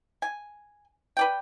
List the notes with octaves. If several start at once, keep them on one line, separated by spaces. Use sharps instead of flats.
G#5
B4 D5 G5